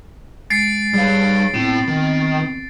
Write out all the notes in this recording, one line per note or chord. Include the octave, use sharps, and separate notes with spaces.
G#3 A6 C7 D7
G3 G#4 C#5 F5
A2 B3 C4
D#3